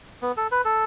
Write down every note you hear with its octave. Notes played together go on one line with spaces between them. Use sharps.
B3
A4
B4
A4